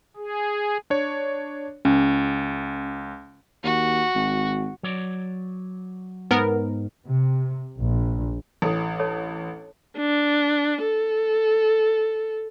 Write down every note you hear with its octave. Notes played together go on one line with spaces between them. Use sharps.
G#4
D4 C#5
C#2 C#4
D#2 F#4
G#1
F#3 C#5 D5
G#2 B3 A#4
C3
A#1
A1 D4 A4
A4 C#5 A5
D4
A4